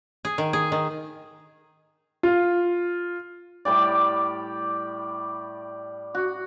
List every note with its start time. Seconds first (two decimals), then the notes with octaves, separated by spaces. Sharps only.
0.25 G#4
0.38 D#3
0.53 G#4
0.72 D#3
2.23 F4
3.65 A2 G3 G4 D5
6.15 F#4